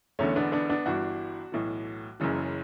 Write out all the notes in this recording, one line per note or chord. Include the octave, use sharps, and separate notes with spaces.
E1 E2 D3 A3 C#4
B3 D4
B3 D4
B3 D4
G1 G2 E3 D4 F#4
B1 A2 E3
F#1 F#2 C#3 E3